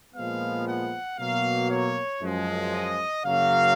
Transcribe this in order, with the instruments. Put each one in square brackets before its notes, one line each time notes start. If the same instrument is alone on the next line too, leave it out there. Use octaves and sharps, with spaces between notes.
[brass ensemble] A#2 F3 G#3 B3 F5
F#5
B2 F#3 A#3 F5
C#5
F#2 F3 G#3
D#5
F#2 C#3 F#3 A#3 F5